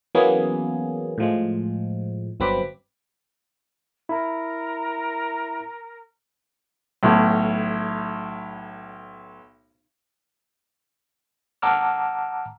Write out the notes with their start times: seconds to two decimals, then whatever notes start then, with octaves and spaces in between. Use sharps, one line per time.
0.15 E3 F#3 A#3 B3 C#4 G#4
1.18 A2 F3 G#3
2.40 G1 F#3 C4 B4 B5 D6
4.09 E4 A#4
7.03 B1 A2
11.62 F#5 A5 A#5 D6 E6 F6